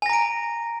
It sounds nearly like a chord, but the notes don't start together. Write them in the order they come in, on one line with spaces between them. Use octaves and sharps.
G#5 A#6 A#5 D7